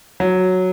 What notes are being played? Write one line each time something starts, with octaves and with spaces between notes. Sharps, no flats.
F#3